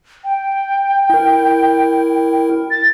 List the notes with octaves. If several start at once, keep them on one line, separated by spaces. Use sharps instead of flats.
G5
E4 A#4
A6